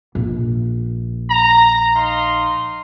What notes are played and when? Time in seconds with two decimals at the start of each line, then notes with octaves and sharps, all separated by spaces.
0.15 A#1
1.30 A#5
1.95 D#4 F5 C6